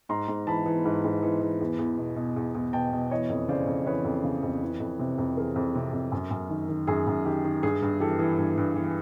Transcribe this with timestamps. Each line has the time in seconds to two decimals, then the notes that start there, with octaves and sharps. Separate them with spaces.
0.09 G#2 A#5 C6
0.28 G#2
0.47 E3 A5 B5
0.66 E3
0.85 G#2
1.04 G#2
1.23 E3
1.41 E3
1.61 E2
1.79 E2
1.98 B2
2.16 B2
2.36 E2
2.55 E2
2.73 B2 G5 A5
2.93 B2
3.11 E3 C#5 D#5
3.30 F2
3.48 C#3 C5 D5
3.67 F2
3.87 E3 B4 C#5
4.05 F2
4.24 C#3
4.43 F2
4.62 E3
4.80 F2
4.99 C3
5.18 F2
5.37 E3 G#4 A#4
5.56 F2
5.75 C3
5.93 F2
6.12 F#2
6.31 F#2
6.50 D#3
6.69 D#3
6.87 F#2 G#4
7.07 F#2
7.25 D#3 G4
7.44 D#3
7.63 G2 G#4
7.82 G2
8.00 E3 G4 A4
8.19 E3
8.38 G2
8.57 G2
8.76 E3